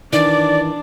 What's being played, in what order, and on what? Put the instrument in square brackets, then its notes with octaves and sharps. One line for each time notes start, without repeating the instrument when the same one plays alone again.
[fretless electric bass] D#3 E3 [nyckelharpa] D4 [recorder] D5